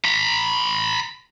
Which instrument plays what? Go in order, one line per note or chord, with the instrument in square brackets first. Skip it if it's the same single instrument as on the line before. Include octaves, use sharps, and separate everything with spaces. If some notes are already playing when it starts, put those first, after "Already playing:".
[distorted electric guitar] A#5 B5